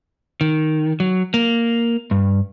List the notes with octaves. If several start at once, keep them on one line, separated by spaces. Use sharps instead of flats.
D#3
F#3
A#3
G2